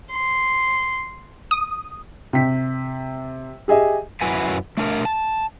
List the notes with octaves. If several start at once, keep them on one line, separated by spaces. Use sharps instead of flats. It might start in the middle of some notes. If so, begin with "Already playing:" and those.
C6
D#6
C3 G5 B6
G4 G#4 D#5 E5
F#2 E4 F#4 B4 G#5
A3 D4 A#4
A5